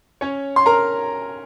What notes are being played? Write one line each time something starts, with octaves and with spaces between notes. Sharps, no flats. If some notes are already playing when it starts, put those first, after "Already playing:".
C#4 C#5
C6
A#4 A#5